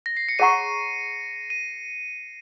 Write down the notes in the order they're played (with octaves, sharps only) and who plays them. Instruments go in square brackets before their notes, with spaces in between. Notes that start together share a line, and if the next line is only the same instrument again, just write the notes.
[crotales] A#6
C7
C#7
[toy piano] G#4 C#5 F#5 A#5 C#6 [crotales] D#7
[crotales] D#7